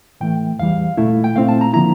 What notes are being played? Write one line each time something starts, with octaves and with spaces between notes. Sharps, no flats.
A2 E3 A3 G5
E2 E3 G3 F5
A#2 A3 E4
G5
A#2 A3 C4 E4 F5
A5
A#5
D3 F3 A#3 E4 A#5